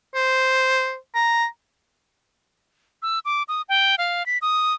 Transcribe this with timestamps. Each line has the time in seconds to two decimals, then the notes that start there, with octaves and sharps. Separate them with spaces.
0.15 C5
1.15 A#5
3.02 E6
3.25 D6
3.48 D#6
3.69 G5
3.98 F5
4.26 B6
4.42 D#6